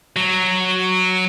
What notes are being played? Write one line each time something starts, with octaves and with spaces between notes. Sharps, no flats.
F#3